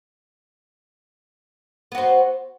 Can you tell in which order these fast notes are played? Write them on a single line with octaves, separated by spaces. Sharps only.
B3 F#4 C5